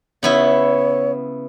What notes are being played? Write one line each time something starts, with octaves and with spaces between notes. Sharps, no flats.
C#3 B3 E4 C#5